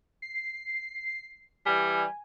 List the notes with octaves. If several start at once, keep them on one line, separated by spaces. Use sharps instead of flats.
C7
E3 G3 G#5